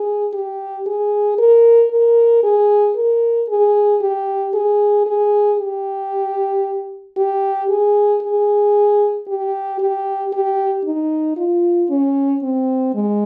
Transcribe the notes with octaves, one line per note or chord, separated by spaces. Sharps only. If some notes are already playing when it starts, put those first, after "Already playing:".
Already playing: G#4
G4
G#4
A#4
A#4
G#4
A#4
G#4
G4
G#4
G#4
G4
G4
G#4
G#4
G4
G4
G4
D#4
F4
C#4
C4
G#3